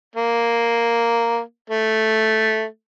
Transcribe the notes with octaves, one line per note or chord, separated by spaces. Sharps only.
A#3
A3